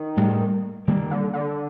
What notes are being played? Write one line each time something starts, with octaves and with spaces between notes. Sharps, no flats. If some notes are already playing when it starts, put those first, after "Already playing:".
Already playing: D#3
A2 G3 A#3
D#3 G3 A#3
D3
D3